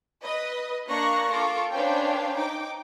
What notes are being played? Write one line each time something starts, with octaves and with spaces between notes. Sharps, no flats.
B4 D#5
A#3 D4 F5 C#6 F#6 A#6
F4 A4 C#6 D6
C#4 D4 B4 C5 F5 G5
D#4 G5 D6